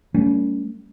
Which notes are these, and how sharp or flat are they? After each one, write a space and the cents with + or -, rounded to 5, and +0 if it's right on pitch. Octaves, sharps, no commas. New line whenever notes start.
G3 +0 A#3 -45 C#4 +35